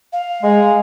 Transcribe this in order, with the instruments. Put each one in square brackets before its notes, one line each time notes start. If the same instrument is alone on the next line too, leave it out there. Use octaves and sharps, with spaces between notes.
[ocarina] F5
[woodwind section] G#3